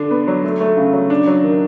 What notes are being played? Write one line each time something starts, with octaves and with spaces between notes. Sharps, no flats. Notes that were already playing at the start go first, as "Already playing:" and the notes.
Already playing: D3 D4
B3
F#3
A3
A3
C#3
F#3
D4
F#3
D#3